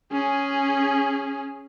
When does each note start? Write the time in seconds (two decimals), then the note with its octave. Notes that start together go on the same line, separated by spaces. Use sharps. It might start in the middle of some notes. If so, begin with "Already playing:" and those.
0.12 C#4 G#4